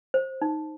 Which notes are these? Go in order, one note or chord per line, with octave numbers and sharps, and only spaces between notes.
C5
D#4